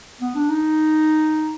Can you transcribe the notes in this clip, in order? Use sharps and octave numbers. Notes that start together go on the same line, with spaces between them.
B3
D4
D#4